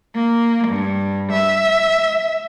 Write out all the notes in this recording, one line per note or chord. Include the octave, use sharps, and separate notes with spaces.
A#3
G2
E5